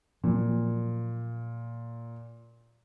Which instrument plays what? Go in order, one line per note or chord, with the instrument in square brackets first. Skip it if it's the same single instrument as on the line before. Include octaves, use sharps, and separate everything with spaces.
[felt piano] A#2 [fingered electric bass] F3 F#3